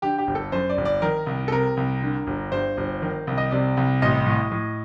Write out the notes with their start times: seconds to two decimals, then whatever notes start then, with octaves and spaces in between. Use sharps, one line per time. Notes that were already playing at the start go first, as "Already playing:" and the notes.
0.02 D3 G4
0.18 G4
0.27 G1
0.35 A4
0.52 F#2 C5
0.69 D5
0.78 G1
0.85 D5
1.02 D#3 A#4
1.27 C2
1.48 A4
1.51 C3 A#4
1.77 C2
2.01 D3
2.27 G1
2.52 G2 C5
2.77 G1
3.02 D#3
3.27 C2
3.38 D#5
3.51 C3 D5
3.77 C2
4.02 A1 D#5
4.26 A2
4.52 A2